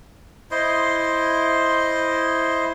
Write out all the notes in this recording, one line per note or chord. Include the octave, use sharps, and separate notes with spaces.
E4 C5 D#5 C6